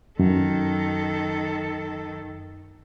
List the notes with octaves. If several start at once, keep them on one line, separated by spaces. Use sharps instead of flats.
F#2 D#3 A4